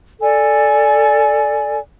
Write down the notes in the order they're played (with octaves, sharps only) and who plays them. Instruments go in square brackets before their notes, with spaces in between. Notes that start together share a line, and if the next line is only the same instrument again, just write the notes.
[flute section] A4 D5 G#5